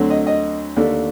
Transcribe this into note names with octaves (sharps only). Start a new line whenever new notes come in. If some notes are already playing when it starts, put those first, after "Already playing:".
Already playing: D2 D3 F#3 A3 C4
D#5
D#5
D#2 D3 A3 D4